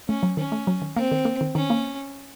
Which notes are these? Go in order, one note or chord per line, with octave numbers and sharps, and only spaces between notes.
A3 C#4
F#3
D#3 C#4
A3
F#3
D#3
A#3 C4
D#3
A#3
D#3
D#3 C#4
A#3